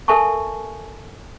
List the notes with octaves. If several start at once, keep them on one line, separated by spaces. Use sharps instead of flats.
A4 A#4 E5 G#5 A5 C#6